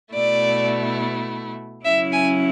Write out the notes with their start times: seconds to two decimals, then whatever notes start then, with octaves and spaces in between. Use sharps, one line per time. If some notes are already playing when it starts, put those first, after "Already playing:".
0.14 B2 A3 E4 D5
1.85 C#3 F#3 C#4 E4 E5
2.13 G#5